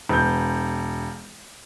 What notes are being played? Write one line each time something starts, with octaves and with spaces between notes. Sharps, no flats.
E1 G6